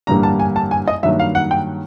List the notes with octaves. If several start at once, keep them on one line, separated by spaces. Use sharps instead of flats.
A1 G2 D3 G3 A#3 A#5
A5
G#5
A5
G#5
D#5
G2 D#3 F#3 A#3 E5
F5
F#5
G5